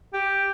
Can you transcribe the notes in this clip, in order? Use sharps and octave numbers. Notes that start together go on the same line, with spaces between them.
G4